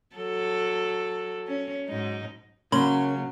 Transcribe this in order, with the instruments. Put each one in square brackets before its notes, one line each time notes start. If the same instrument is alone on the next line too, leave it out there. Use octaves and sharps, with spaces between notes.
[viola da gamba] F#3 A4
C#4
G#2 F#3 D#4
[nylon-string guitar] C#3 [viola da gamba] F#3 [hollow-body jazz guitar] A#3 C#4 [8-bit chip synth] B5 C6